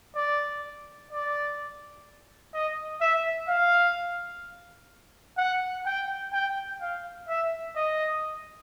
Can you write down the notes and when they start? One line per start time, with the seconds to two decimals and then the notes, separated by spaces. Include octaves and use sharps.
0.16 D5
1.11 D5
2.54 D#5
3.01 E5
3.48 F5
5.38 F#5
5.86 G5
6.33 G5
6.81 F5
7.28 E5
7.76 D#5